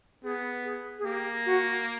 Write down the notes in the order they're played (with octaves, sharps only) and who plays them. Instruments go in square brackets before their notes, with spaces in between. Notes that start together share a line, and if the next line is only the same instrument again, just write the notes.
[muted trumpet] B3 [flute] G#4
[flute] G#4
G#4
[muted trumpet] A#3 [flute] G4
[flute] F#4